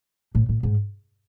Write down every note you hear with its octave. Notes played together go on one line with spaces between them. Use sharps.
A2
A2
G#2